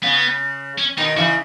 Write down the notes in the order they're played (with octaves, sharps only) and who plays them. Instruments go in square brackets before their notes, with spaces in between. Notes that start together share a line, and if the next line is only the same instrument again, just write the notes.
[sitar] C#3 [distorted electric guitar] B3
[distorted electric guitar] C#4
[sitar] B2 D#3 [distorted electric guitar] D#4
[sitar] C#3 E3 [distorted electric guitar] F#4